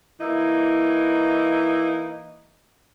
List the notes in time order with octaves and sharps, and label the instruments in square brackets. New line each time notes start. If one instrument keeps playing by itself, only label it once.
[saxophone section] E3 A#3 D#4 E4